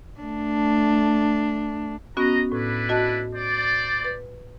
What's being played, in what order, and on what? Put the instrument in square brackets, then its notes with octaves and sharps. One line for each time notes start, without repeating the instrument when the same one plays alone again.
[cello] A3 D4
[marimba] B3 C#4 F#4 [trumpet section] D#5 A#5
[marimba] A2 [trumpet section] D4 E4 B4
[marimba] F#4 D#5 A5
[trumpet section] C5 D5
[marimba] B4